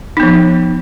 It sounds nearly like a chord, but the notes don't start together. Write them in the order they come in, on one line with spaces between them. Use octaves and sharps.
D#4 B3 F3